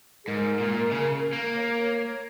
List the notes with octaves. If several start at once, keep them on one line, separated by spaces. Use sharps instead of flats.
G#4
G#2 A#4
A#2
C#3
A#3
C#5